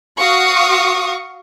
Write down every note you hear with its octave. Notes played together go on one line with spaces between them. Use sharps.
F#4 F5 C#6 D#6